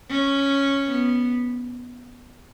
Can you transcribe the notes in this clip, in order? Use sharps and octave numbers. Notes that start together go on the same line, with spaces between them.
C#4
B3